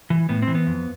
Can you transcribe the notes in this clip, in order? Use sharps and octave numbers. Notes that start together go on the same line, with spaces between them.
E3
A2 B3
C4
E3
B3
F2